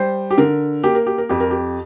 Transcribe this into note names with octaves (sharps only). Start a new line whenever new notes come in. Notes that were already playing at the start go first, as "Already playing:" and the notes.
Already playing: G3 C5
G4
D3 A#4
A#3 G4
A#4
G4
A#4
F2 G4
A#4
G4